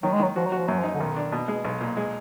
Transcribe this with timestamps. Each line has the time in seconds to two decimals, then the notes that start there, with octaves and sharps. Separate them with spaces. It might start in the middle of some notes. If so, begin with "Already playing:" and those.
0.03 D#3 F#3
0.13 G#3
0.19 D#3 F#3
0.36 F3 F#4
0.46 F#3
0.52 F#4
0.58 F3
0.68 F#2 F#3
0.79 F3
0.84 D#4
0.95 D3
1.00 B1 D#3
1.16 D4
1.32 B2
1.48 G#3
1.65 B1
1.81 A#2
1.97 G#3